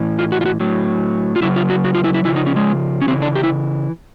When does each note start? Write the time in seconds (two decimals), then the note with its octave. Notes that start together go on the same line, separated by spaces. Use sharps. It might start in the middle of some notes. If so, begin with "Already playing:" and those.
Already playing: A2 E3
0.19 F4
0.32 F#4
0.41 F4
0.46 F#4
0.60 A2 F#3
1.36 F4
1.42 C#3 F#3 E4
1.56 F4
1.70 F#4
1.84 F#4
1.95 F4
2.04 E4
2.14 E4
2.25 C#3 F3 E4
2.36 D#4
2.47 C#4
2.56 G#3
3.01 C#4
3.08 C#3 E3 C4
3.22 D4
3.35 G4
3.43 E4